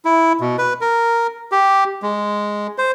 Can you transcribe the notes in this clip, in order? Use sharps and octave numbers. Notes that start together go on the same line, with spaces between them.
E4
B2
B4
A#4
G4
G#3
C5